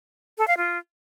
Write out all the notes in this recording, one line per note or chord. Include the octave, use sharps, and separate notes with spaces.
A4
F5
F4